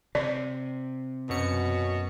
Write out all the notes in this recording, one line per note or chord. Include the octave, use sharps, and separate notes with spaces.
C3 D5
F#2 B2 C#7